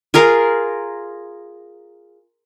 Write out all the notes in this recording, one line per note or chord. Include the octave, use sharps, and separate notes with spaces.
F4 G#4 A#4 F5